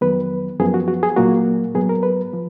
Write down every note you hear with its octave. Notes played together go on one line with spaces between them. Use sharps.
F2 D#3 F#3 B3 B4
F#2 F3 B3 G#4
F#4
F#4
G#4
A#2 F#3 A#3 F#4
G#2 F#3 B3 G#4
A#4
B4
F3